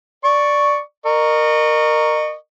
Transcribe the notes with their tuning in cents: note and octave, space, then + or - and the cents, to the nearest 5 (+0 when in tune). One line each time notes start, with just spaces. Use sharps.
D5 +0 C#6 +0
A#4 +0 D#5 -35 C#6 +0